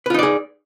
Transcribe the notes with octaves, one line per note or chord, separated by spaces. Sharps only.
D#4 F4 G#4 B4 D5